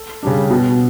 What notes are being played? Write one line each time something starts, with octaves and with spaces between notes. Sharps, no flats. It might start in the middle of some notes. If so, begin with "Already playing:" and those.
Already playing: A4
C#3 G3 D4
B2